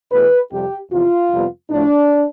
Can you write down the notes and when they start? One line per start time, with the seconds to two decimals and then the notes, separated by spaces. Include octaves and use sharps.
0.11 E2 B2 A3 B4
0.51 F2 C3 G3 G4
0.91 E2 C3 F3 F4
1.30 F2 C3 G3 B3
1.70 A2 F3 A3 D4